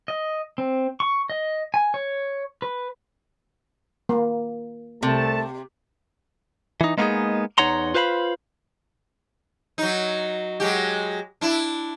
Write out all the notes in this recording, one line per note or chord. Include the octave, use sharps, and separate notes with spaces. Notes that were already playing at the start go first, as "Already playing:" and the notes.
D#5
C4
C#6
D#5
G#5
C#5
B4
A#3
C2 C3 A3 A5
E3 D#4
G#3 A#3 B3 C#4 D#4 G#4
E2 D#4 C#5 F#5 A#5 C6
F4 B4 C5 F5 A5 B5
F#3 D#4
F#3 G#3 G4
D4 E4